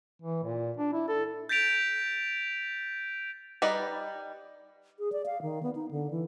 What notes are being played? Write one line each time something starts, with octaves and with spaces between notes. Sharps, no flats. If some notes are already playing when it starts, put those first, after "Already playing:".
E3
A#2
D4
E4
A4
G6 A6 B6 D7 F7
G3 D#4 B4 D5
G#4
D5
F5
D#3
B3
D#4
D3
E3